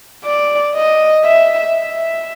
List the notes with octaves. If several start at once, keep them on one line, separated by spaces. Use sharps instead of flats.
D5
D#5
E5
E5